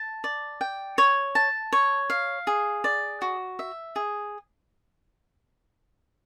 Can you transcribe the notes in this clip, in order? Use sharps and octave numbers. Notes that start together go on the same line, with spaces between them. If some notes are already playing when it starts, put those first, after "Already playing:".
Already playing: A5
D5
G5
C#5
A5
C#5
F5
G#4
D5
F#4
E5
G#4